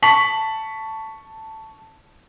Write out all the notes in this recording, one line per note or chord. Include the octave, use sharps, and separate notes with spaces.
A5 C#6 B6 F#7